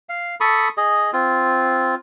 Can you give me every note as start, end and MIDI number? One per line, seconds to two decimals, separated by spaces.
0.09 0.35 77
0.40 0.68 69
0.40 0.68 83
0.40 0.68 85
0.40 0.68 87
0.77 1.11 68
0.77 1.11 75
1.13 1.95 60
1.13 1.95 65